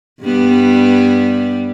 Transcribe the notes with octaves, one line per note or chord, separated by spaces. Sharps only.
G2 G3 B3